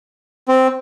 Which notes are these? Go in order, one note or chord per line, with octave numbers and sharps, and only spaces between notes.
C4